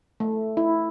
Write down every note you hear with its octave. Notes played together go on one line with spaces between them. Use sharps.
A3
E4